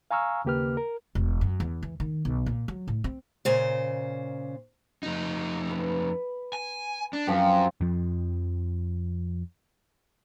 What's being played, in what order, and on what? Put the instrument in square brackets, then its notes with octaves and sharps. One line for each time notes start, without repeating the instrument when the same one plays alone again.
[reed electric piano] F5 G#5 A#5 C#6 E6 F6
D#2 C#3 A#3 G4 B4 F6
A#4
[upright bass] E1
F#2
E2
E3
D#3
B1
A#2
F#3
A2
C4
[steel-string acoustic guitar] A#2 C#3 C5
[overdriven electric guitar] F2 D#4
[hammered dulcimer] B4
[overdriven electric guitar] G#5
D4
[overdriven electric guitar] F#2 [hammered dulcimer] F3 C4 G4
[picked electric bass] F2 F3